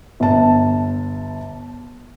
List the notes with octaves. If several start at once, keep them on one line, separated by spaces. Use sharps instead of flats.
G1 A5